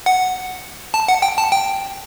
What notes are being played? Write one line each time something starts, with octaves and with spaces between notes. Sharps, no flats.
F#5
A5
F#5
G5
A5
G5